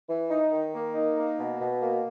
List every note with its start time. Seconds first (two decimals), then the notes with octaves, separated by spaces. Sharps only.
0.08 E3
0.31 D#4
0.52 D#3
0.74 A#3
0.95 D#4
1.17 A#3
1.39 B2
1.60 B2
1.82 A#3